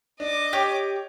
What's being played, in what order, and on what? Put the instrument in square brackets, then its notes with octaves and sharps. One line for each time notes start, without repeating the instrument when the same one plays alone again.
[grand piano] D4 [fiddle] D#5 D6
[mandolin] G4 [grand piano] C#5